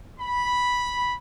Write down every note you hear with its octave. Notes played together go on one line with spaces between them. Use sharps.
B5